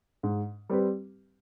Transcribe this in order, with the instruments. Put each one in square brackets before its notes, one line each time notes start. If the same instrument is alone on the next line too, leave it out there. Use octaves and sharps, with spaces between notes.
[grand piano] G#2
G3 C4 G4 B4